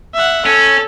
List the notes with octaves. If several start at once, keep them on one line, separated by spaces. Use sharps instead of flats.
E5 F#5
C#4 A4